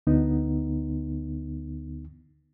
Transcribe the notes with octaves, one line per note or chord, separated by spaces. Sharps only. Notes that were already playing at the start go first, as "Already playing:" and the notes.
D2 D3 B3 D#4